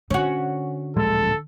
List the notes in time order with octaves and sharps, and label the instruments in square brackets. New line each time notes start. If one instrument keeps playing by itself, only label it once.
[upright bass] D3 [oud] C#4 F#4
[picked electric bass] D1 A#1 G#3 [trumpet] A4